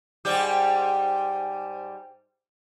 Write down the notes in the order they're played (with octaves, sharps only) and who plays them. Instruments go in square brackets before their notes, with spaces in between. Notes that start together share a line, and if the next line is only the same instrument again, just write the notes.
[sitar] G#2 G3 G4